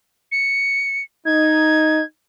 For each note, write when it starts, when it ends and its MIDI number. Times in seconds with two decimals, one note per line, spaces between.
0.32 1.01 97
1.25 2.00 63
1.25 2.03 92